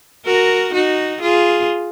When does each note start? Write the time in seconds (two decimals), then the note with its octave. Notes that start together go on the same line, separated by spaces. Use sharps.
0.26 F#4 A#4
0.73 D#4 F#4
1.21 F4 G#4